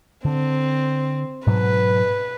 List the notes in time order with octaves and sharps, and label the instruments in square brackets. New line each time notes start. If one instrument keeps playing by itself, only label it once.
[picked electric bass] D3 [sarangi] C4
[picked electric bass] G#2 B2 F#3 [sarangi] B4